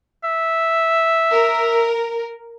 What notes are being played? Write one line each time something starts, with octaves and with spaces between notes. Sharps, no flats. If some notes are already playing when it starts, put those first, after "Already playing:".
E5
A#4